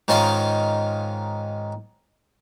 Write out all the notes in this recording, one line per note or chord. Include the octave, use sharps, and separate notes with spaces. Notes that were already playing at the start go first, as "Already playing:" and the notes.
G#2 D#3 C#4 F4 A#4 F5